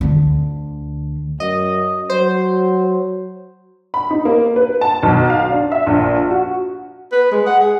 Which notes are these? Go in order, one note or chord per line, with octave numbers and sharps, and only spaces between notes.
D2 D3
F#2 D#5
F#3 C5
B5
D#4
A#3
B4
A5
B1
F5
D4
E5
A#1
F#4
B4
G#3
F#5
G#4